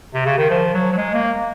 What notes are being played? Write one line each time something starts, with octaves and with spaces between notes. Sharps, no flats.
C3
C#3
D#3
F3
F#3
F#3
G#3
A#3